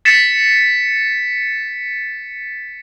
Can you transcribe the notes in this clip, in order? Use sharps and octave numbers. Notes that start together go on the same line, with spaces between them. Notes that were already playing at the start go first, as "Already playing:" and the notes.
A6 B6 C#7 E7